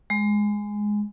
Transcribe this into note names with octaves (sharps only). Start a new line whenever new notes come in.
G#3